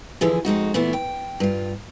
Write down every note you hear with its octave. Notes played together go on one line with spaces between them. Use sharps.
D3 E3 F3 E4 G#4
F2 G#3 D#4 F#4
A#2 E3 A3 B3 E4
G5
G2 F4